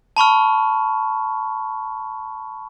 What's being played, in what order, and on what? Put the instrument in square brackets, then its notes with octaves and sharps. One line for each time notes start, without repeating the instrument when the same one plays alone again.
[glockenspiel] A5 B5 C#6 F6